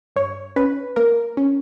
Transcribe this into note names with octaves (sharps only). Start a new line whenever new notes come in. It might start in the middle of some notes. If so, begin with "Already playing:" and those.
G2 C#5
C#4 B4
A#3 A#4
C#4